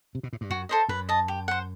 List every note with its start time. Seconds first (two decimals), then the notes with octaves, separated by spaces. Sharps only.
0.15 C3
0.23 B2
0.33 A2
0.41 G2
0.50 F#2 F#4
0.69 A4 C5 D#5
0.89 F#2 B4
1.09 D#5 A5
1.28 G4
1.48 C5 F#5